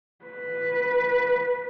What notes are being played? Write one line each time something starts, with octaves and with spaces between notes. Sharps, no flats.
B4